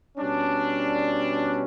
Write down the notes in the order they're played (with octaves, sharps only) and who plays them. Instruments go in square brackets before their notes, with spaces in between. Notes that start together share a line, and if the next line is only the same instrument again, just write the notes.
[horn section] B2 G3 C#4 D4